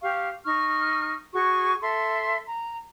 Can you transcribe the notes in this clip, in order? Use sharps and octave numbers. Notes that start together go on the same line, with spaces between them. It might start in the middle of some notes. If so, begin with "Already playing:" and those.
G4 F5 C#6
D#4 C#6 F6
F#4 G#4 C#6
A4 E5 C6
A#5